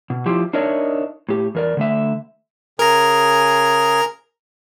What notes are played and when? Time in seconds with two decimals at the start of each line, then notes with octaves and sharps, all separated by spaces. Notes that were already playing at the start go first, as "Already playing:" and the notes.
0.10 B2
0.26 F3 E4 F4 G4
0.53 D4 D#4 A#4 C#5 D#5 E5
1.29 A2 G4
1.55 E2 A#4 D5
1.77 D3 A3 E5
2.79 C#3 G#4 A#4 G#5 A#5